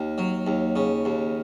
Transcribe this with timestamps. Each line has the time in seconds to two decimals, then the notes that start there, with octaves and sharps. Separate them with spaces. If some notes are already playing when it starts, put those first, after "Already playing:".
Already playing: D#2
0.18 F#3
0.47 D#2
0.76 C#3
1.05 D#2